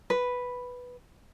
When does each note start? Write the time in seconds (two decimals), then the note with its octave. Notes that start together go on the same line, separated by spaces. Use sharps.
0.10 B4